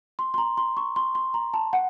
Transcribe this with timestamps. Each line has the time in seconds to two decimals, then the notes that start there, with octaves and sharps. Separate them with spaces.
0.19 C6
0.34 C6
0.38 A#5
0.58 C6
0.77 C#6
0.96 C6
1.15 C6
1.34 A#5
1.54 A5
1.73 F#5